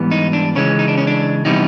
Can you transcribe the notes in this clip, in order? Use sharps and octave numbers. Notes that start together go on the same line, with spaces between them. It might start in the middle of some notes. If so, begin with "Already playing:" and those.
Already playing: G#2 E3 G3 B3
D#4
D4
C#3 E3 G#3 C#4
D#4
D4
C#4
D4
C3 E3 G3 B3 D#4